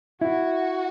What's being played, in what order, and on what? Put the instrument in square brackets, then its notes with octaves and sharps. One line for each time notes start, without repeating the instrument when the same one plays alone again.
[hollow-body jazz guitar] E4 [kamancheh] F#4